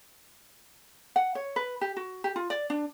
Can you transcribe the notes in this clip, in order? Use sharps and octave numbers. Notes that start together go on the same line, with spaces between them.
F#5
C#5
B4
G4
F#4
G4
F4
D5
D4